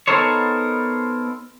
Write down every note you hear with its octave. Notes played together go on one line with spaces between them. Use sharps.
B3 D#4 A4 A#4 C5 C#5